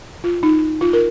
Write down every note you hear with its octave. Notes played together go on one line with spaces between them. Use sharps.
F4
D#4
F4
A#4